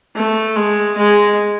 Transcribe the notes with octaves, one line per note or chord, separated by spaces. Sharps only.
A3
G#3
G#3